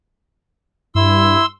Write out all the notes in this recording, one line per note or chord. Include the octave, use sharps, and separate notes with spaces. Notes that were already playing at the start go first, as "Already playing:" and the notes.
G2 E4 C6 E6